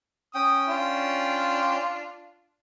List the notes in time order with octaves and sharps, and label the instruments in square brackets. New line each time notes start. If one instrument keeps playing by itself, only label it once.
[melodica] C#4 G5 [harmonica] D#6
[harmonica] D4 F4